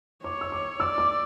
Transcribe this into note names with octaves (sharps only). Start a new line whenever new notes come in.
C#5 D6
E6
D6
D5 E6
D6